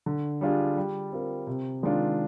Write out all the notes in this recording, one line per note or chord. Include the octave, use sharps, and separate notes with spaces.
D3
G3 D4 F4 G#4
G3
C4 F4 A#4
C3
D#3 G#3 D4 F4